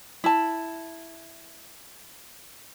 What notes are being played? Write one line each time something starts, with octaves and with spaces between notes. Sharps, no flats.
E4 A5